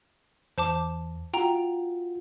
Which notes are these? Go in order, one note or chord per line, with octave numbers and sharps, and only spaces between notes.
E2 C5 A5 D6
F4 F#4 G5 A#5